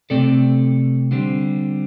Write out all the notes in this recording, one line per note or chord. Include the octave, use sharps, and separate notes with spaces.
C3 A3 C4 A4 D5
D3 G3 C4